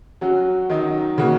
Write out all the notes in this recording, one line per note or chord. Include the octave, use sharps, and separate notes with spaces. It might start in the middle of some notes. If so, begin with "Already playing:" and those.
F#3 C#4 F#4
D#3 F#3 D#4
C#3 A#3 F#4